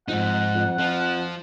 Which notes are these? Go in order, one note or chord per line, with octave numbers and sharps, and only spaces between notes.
F2 G#2 D#4 F#5
F2
F2 F3